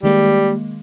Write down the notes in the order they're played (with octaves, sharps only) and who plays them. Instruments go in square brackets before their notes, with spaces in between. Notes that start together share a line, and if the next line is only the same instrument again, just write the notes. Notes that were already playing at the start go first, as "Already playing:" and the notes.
[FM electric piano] D#3 G#3 A#3 [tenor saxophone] G3